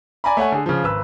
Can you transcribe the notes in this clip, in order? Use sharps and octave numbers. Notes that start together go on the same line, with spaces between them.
D5 G#5 A#5 B5
A3 C#5 F#5 G#5
D3 G#4
C#3 F3
G#1 B4 E6